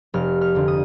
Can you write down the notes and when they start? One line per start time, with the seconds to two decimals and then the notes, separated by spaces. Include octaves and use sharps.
0.14 F1 F6
0.41 F6
0.55 F2 D3 F3
0.68 D#6